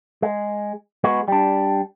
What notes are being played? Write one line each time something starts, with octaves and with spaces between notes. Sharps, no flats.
G#3
G#3 B3 F#4
G3 D4